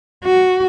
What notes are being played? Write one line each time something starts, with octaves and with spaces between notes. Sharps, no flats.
F#4